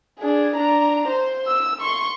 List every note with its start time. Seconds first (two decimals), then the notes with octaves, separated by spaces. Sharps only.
0.19 D4 G#4
0.56 D4 A#5
1.08 C5
1.47 E6
1.81 C6 C#6